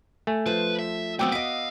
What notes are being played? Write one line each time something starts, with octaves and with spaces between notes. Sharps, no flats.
A3 G#5
F3 B4 C5
E5
F#3 A3 B3 C4 F#4 G5 D6 E6
D#5 F5 D6 B6 D7